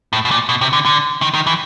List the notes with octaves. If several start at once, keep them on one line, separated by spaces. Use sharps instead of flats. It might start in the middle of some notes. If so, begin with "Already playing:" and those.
A2
B2
A#2
B2
C3
D3
D3
D#3
D#3
E3